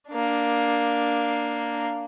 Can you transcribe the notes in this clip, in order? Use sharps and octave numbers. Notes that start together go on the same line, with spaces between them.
A#3 D4